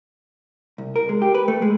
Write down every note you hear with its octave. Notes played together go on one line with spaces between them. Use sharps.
C2
A#4
G#3
G4
B4
A3
G#3